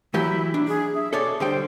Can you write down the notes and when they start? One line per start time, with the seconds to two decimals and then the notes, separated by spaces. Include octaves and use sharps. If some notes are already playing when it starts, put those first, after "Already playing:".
0.14 E3 F#3 E4 G4
0.54 D4
0.68 G#4
0.94 E5
1.13 G#4 A4 C#5 D5
1.40 D3 G3 C5 G5